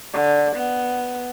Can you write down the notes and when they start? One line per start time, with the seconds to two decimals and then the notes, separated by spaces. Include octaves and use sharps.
0.13 D3
0.56 B3